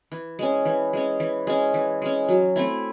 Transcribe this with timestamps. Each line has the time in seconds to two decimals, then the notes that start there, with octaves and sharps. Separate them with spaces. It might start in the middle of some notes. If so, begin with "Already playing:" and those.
0.12 E3
0.39 G#3 C#4
0.65 E3
0.93 G#3 C#4
1.20 E3
1.47 G#3 C#4
1.74 E3
2.02 G#3 C#4
2.28 F#3
2.56 A3 C4 E4